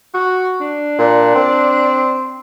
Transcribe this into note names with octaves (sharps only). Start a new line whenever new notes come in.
F#4
D4
A#2
C4